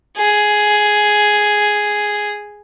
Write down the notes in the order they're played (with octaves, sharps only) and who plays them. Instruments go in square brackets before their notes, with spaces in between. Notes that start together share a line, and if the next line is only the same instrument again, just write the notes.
[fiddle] G#4